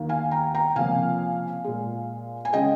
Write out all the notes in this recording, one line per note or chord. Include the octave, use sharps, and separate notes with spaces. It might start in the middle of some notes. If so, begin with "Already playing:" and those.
Already playing: D#2 D#3 A#3
F5 G#5
G5 A#5
G5 A#5
C#2 C3 F3 A#3 F5 G#5
A#2 G#3
G#5
C#3 G#3 D#5 G5